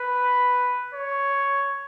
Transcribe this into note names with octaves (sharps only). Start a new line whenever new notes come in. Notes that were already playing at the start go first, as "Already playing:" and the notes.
Already playing: B4
C#5